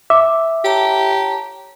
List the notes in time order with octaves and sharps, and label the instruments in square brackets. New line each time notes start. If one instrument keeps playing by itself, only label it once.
[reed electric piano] E5 [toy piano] D6
[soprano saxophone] G4 [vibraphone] C#5 A5 A#5